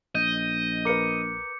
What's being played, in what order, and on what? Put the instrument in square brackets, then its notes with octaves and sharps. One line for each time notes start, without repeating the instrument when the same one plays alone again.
[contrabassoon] A#1 [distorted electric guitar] D#5 [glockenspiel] G6
[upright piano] A#4 B4 [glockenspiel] D6 C#7